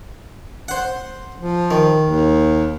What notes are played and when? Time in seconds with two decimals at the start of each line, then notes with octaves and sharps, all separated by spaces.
0.68 C5 F#5
1.38 F3
1.71 D#3
2.03 D#2